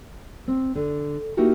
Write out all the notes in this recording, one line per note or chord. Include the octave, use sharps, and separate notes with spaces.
C4
D3
A#3 D#4 E4 F#4 G4 A#4